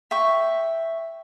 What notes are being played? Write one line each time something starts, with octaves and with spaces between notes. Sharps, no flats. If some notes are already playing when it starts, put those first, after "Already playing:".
E5 G5 C#6